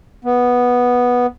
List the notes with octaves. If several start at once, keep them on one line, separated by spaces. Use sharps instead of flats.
B3